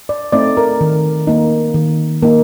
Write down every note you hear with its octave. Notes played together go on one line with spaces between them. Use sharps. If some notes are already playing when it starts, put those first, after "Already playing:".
D5
A3 C4 D#4 D5
A#4
D#3
A#3 D#4
D#3
A#3 D#4